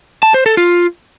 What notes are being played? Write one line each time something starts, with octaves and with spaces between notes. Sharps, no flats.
A5
C5
A4
F4